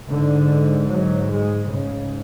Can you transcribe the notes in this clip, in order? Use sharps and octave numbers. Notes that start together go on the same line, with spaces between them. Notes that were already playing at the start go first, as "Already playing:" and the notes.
G#2 D3
F#3
G#3
G#2 C#3